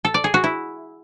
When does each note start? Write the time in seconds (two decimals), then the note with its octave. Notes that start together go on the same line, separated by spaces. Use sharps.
0.05 A4
0.14 D5
0.24 G#4
0.34 F#4
0.44 E4